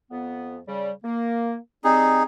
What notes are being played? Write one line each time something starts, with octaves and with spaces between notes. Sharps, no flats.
F2 B3
C#3 G3
A#3
G3 C4 D#4 G#4